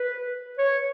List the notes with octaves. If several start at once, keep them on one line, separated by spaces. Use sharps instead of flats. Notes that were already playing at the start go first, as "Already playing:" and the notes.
Already playing: B4
C#5